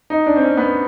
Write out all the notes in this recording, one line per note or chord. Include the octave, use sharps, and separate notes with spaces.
D#4
D4
C4
C#4
B3